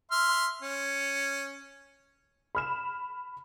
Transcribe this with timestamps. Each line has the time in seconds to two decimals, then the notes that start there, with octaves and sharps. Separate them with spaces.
0.11 E5 C6 F6
0.62 C#4
2.55 B5 F6 E7